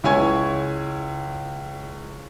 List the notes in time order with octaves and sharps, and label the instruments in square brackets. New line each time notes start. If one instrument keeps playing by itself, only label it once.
[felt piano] C#2 E4 C#5 G#5 C#6 G#6